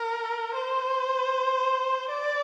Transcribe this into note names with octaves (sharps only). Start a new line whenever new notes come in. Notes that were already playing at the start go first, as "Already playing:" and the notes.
Already playing: A#4
C5
D5